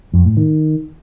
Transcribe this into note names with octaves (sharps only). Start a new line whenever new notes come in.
F2
A2
D#3